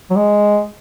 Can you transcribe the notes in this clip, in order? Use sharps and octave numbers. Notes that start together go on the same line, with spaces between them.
F#3
G#3